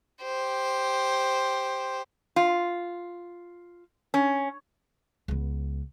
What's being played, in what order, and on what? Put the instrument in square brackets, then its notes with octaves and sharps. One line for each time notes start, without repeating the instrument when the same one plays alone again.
[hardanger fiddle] G4 C5
[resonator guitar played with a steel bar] F4
C#4
[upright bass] C#2 B3